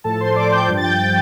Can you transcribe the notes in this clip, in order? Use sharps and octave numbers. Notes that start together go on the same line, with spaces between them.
A2 F3 A4 A5
C5 C6
D5 D6
G5 G6
G2 F3
A6
G5 G6
G5 G6